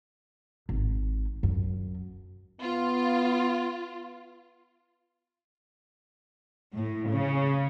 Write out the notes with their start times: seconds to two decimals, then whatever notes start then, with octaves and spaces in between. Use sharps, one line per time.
0.69 G#1
1.43 F#2
2.61 B3 F4
6.74 A2
7.09 C#3